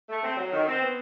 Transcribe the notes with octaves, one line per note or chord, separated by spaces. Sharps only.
A3
C4
F#3
D#3
C4
B3